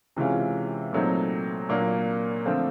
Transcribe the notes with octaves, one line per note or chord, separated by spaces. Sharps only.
C3 E3 G#3 C#4 F4
A#2 F#3 A3 C4 D#4
A#2 F#3 A#3 D4
D3 F3 A3 C4 F4